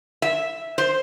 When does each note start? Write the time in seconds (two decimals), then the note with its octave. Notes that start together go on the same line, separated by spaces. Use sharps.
0.22 E5
0.78 C5